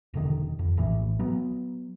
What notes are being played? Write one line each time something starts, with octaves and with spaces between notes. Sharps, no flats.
E1 D3 D#3
F2
A#1 A2 E3
F#3 B3